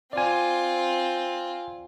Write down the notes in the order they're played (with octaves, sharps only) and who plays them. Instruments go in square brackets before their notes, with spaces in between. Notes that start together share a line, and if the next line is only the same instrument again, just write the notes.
[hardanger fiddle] C4 F4 [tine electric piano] D5 G#5